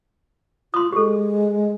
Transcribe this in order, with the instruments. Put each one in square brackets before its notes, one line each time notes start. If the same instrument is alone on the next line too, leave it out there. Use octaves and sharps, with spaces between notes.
[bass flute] F4 [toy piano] C6 D#6
[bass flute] G#3 [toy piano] G4 A4